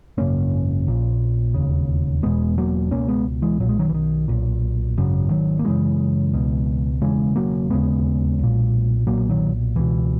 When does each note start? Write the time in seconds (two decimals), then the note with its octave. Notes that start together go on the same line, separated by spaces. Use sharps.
0.17 G#1 F#2 C#3 A#3 C#4
0.87 A#1 A#2
1.54 E1 D#2 C#3
2.22 E1 E2 B2 G#3 B3
2.58 F#3 A#3
2.91 C#2 B2 A#3 C#4
3.08 G#3 B3
3.42 E3 G#3
3.60 B1 A#2 F#3
3.69 G#3
3.79 D#3 F#3
3.89 E3
3.94 D#3
4.28 B1 A#2
4.97 G#1 F#2 C#3
5.31 D#3 F#3
5.59 A#3
5.65 F#1 F#2 C#3 E3 G#3
6.33 C#2 B2
7.02 E1 E2 C#3 E3 G#3
7.36 F#3 A#3
7.70 E1 D#2 C#3 G#3 B3
8.39 B1 A#2
9.07 B1 A#2 F#3 A#3
9.29 D#3 F#3
9.76 C#2 B2 E3